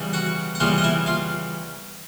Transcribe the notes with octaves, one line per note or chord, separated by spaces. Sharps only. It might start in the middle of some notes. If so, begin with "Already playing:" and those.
Already playing: C#3 E3 G3 B3
F#4 F#5
F#5
C#3 E3 G3 B3 F4 F5
D#5
E4 E5
F4 F5